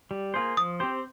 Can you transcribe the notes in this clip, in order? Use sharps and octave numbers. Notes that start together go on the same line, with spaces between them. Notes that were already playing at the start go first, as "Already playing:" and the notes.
G3
A#3 F4 G#4 C5
F3 D#6
C4 G4 C5